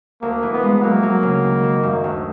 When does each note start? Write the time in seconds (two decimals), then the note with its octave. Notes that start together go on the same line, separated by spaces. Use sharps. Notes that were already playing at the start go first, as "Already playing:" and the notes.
0.22 D2 A#3
0.43 E3
0.53 B3
0.63 G#3
0.82 F#3 A#3
1.03 F#3
1.23 C#3
1.44 D#3
1.64 D#3
1.83 F#2
2.04 D2